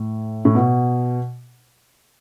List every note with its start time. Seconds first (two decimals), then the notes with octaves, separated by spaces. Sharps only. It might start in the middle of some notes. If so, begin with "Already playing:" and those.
Already playing: A2
0.45 A2
0.55 B2